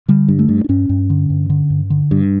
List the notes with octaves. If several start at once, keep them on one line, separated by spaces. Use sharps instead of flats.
D3 G3
G2
A3
G2
D4
G2 C#4
G2
D3
G2
D3
G2
D3
G2